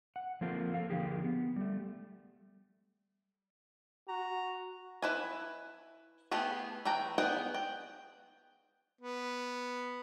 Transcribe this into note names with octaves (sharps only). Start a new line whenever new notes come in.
F#5
F3 A#3 C4 F4 A4 A#4
A4 F5
D3 F3 A#3 G4 G#4
B3
G3 A3
F#4 A#5
E4 B4 G#5
A3 B3 E4 G4 G#4
E3 A3 G5 A#5
G3 B3 G#4 F#5 G5
G5
B3